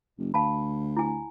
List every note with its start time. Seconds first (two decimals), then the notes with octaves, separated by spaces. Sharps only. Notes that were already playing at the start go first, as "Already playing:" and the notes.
0.19 F#1
0.34 D2 F5 A5 B5
0.97 E4 G#5